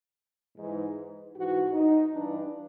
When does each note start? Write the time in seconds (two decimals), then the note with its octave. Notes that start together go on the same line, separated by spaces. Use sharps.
0.57 G#2 E3
1.34 G#2 E3 F#4
1.73 D#4
2.11 G2 E3 D4